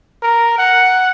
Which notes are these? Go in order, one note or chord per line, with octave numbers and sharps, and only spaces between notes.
A#4
F#5